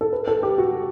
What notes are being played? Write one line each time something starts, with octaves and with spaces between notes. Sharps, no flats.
A4
B4
A4
G4
F#4